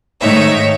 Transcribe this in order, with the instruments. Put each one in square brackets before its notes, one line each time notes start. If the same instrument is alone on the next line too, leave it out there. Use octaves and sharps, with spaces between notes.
[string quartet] G#2 D#3 A3 D#4 C#5 E5